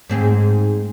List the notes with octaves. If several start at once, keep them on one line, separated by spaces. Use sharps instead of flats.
G#2 C4 G#4